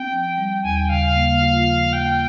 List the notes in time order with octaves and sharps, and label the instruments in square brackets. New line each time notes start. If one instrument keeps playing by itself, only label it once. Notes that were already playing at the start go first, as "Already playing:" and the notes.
Already playing: [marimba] C4 [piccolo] G5
[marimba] F3
G3
[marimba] D#2 [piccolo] G#5
[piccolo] G5
[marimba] C#3 [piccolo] F5
[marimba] A#3
F4
F3
[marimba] A#3 [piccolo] G5